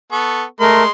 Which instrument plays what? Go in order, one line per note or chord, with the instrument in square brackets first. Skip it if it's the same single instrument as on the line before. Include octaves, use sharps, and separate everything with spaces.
[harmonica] B3 A4 C#6
[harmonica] G#3 C6 [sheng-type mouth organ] A3 A#4